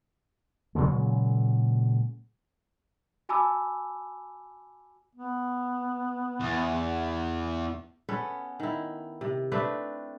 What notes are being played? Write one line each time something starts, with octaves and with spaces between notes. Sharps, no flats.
A#2 C#3 F#3 G#3
F#4 G#5 A5 B5 D6 E6
B3
E2
B3 C#4 A4 B4
D#3 E4
C3
A3 C4 D4 B4